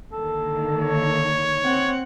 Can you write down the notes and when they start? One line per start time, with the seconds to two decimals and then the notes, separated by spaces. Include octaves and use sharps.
0.13 D3 D#3 A#3 A4
0.80 C#5
1.64 C4 F#5